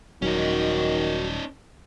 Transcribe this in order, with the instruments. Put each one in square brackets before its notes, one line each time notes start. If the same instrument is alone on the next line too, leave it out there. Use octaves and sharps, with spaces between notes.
[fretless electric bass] D#1 F#3 [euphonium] D#3 [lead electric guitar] C#4 D#4 [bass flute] F#4